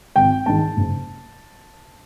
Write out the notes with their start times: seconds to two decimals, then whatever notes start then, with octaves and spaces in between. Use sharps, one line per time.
0.16 G#1 G5
0.46 G#2 D#3 A5
0.77 F#1